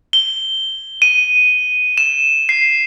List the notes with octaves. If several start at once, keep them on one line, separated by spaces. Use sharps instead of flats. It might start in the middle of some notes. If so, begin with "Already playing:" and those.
G7
D#7
E7
C7